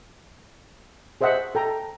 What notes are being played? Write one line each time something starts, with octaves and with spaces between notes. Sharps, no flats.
G#4 C5 D#5 E5 F#5
A4 G5 A#5